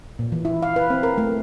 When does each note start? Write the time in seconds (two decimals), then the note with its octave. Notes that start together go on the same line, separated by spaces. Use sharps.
0.19 A#2
0.32 E3
0.45 E4
0.63 F5
0.76 B4
0.90 C4
1.03 A#4
1.18 A3